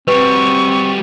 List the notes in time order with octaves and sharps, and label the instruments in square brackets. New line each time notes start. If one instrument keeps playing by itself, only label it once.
[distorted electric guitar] G3 F#4 [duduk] C4 [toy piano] B4 [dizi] C#6